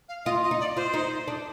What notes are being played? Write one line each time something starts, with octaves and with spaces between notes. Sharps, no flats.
F5
F4 D#5
D#5
D#4
D5
F4 C5
D#4
D4